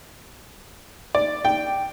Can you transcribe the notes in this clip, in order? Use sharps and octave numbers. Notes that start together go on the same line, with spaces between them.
D5
G5